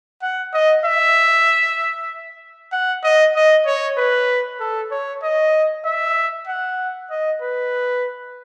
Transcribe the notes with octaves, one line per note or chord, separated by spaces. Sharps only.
F#5
D#5
E5
F#5
D#5
D#5
C#5
B4
A4
C#5
D#5
E5
F#5
D#5
B4